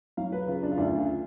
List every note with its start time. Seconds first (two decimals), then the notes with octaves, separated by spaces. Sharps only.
0.17 F#3 F5
0.32 B4
0.47 C#3 F4
0.63 D4
0.71 F4
0.77 D2 D4
0.98 F4